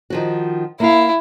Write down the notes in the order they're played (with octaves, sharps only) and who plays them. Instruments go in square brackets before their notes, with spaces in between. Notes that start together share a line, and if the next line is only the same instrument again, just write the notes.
[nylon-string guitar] D#3 F3 F#4
[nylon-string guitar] A#3 F5 [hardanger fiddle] E4